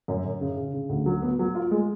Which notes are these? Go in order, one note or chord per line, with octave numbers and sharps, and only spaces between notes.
F#2
F#2
C#3
C#3
C#3
D2
F#3
B3
F#3
F4
G#3